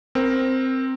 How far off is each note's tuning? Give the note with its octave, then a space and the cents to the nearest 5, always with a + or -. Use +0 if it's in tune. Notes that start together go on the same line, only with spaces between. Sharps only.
C4 +0 A#4 +0